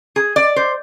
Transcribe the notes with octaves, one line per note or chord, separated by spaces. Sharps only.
G#4
D5
C5